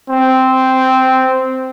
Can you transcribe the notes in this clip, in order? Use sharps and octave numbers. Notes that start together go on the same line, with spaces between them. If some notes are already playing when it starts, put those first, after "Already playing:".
C4